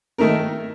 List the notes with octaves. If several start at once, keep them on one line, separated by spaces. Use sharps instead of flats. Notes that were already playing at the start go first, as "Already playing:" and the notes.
D#3 A3 D#4 A#4